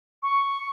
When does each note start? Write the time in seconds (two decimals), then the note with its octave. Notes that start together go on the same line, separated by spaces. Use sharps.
0.23 C#6